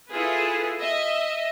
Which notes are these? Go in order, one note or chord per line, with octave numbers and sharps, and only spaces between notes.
E4 F4 G#4 A4 B4
D#5 E5